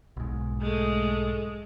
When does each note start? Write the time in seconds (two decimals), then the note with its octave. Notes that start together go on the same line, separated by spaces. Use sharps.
0.17 B1 G#2
0.62 G#3 A3